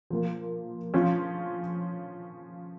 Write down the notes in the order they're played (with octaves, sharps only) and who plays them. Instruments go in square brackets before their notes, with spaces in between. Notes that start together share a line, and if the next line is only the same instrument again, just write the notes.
[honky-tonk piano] F3 A#3 F4
F3 C#4 F4